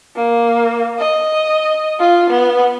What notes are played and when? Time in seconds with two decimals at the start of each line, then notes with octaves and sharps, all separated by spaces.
0.17 A#3
0.99 D#5
2.00 F4
2.30 B3